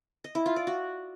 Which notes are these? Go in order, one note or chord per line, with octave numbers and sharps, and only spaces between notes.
D#5
E4
F4
D5
F#4